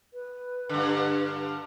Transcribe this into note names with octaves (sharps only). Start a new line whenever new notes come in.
B4
G2 D3